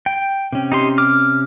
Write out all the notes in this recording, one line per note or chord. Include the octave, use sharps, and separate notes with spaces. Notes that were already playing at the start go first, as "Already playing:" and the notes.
G5
C3 C#4
D#4 G4 C6
D6 F6